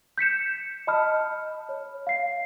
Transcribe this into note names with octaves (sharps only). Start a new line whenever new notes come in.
G6 B6 C#7 E7
D#5 A5 B5 D#6 F6
C#5
F5 C7